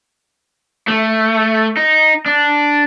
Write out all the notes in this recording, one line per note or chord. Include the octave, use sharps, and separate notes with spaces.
A3
D#4
D4